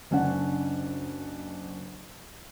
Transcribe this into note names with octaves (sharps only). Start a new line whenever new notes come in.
F#1 C#4 D4 F#5